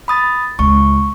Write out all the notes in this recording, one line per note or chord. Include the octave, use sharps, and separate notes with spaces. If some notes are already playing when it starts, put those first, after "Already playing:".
B5 D#6 A6
C#2 C#6